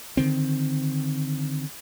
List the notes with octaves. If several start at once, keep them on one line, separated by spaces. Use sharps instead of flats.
D3 D#3 C4